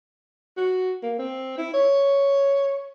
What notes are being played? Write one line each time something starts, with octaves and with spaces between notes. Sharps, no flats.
F#4
A#3
C4
E4
C#5